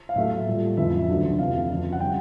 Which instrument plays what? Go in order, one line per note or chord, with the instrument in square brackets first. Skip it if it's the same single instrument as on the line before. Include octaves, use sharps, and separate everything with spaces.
[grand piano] F5
A2 F#3 A3 E5
A#2 G3
F2 C#3 E3 G#3 E5
D2 D3 F#3
F2 C3 E3 F5
F2 C#3 F3
F#5
C#3 E3 G3 G5